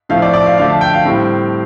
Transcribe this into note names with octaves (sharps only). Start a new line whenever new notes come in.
A2 F3 A3 C4 F5
D5
D5
F5
D3 F3 A3 F5
A5
G5
F5
A2 G3 C4